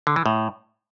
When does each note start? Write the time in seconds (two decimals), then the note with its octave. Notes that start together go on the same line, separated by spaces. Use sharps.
0.07 D3
0.16 E3
0.26 A2